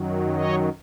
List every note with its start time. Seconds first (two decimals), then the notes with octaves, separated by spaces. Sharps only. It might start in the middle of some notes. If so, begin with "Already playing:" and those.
Already playing: F#2 D#3 F#3
0.35 C#5 D#5